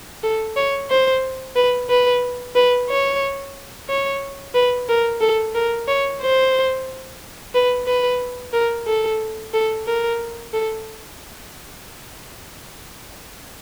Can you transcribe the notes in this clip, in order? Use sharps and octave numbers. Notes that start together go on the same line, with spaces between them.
A4
C#5
C5
B4
B4
B4
C#5
C#5
B4
A#4
A4
A#4
C#5
C5
B4
B4
A#4
A4
A4
A#4
A4